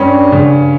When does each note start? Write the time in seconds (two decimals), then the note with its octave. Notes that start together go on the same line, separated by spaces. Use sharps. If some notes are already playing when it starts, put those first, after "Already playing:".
Already playing: G2 G3 C#4
0.32 C#3